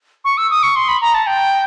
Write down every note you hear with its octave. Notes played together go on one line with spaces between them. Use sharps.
C#6
E6
D#6
C#6
C6
B5
A#5
A5
G5